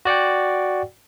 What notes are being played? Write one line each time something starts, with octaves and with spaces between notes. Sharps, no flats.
F#4 D5 F#5 G5